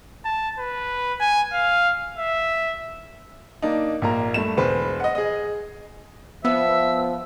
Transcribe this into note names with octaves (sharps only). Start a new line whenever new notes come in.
A5
B4
G#5
F5
E5
A#3 D4 D#4
A#1 A#3 A#5
G2 A3 E7
E1 B4 C5
D#5 F#5
G#4 D#5
F3 B3 E5 E6